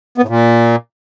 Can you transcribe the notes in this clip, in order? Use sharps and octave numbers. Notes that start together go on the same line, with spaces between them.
B3
A2
A#2